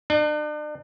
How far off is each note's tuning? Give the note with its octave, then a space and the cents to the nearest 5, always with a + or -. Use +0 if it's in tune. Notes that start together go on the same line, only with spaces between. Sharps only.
D4 +40